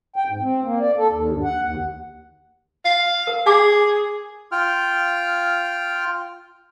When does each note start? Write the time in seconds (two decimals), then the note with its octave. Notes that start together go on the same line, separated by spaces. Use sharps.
0.16 G5
0.29 G#2
0.42 C4
0.63 A#3
0.80 D5
0.98 A4
1.11 D#2
1.30 G2
1.44 F#5
1.63 D#2
2.85 F5
3.27 A#4
3.46 G#4 G#5 D6
4.52 F4 G5 F6